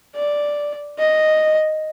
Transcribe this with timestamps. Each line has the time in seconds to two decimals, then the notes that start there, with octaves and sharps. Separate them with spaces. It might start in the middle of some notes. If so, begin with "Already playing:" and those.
0.16 D5
0.99 D#5